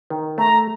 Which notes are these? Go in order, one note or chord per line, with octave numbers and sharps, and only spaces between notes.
D#3
A3 A#5